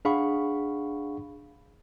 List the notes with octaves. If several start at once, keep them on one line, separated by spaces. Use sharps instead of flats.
D4 G#4 F5 F#5 B5 C#6